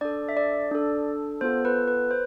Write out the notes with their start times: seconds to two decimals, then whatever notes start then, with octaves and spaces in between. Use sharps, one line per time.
0.01 D4 A4 D5
0.29 E5
0.37 D5
0.71 D4 A4
1.41 B3 F4 A4 C5
1.65 B4
1.88 B4
2.11 C5